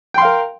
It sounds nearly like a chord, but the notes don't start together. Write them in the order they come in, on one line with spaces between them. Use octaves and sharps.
G5 C6 F5 A#4